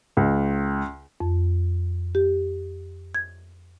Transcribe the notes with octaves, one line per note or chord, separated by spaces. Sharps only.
C#2
F2
G4
G#6